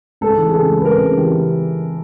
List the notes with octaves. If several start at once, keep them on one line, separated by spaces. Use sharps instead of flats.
C#2 A4
E3
G#4
C#3 A4
C#2
B4
C#2 A#4
C#3
E3 G4
C#3